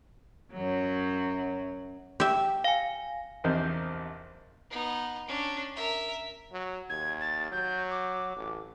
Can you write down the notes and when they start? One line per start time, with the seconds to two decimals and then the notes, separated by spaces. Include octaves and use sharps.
0.53 F#2 F#3
2.20 G4 E5
2.64 F5 G#5
3.44 A#1 E2 C3 D#4 A#4 C5
4.70 B3 D#4
5.28 C#4 D4
5.75 A#4 E5
6.52 F#3
6.90 D#2 G#6
7.21 A6
7.52 F#3 G6
7.91 D6
8.36 A1